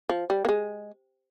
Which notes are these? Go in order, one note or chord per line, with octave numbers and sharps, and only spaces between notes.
F3
G3
A#3
G#3